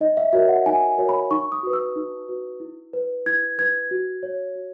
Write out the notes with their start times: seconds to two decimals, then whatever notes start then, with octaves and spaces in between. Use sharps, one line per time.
0.01 D#4 D#5
0.17 E5
0.33 F#4 A#4 C#5 E5
0.49 F#5
0.66 D#4 G#5
0.98 F#4 A#4 C#5
1.09 B5
1.31 D#4 C#6
1.52 D#6
1.63 F#4 B4
1.73 E6
1.96 D#4
2.28 F#4 B4
2.60 E4
2.93 B4
3.26 E4 G#6
3.58 B4 G#6
3.91 F#4
4.23 C#5
4.55 F#4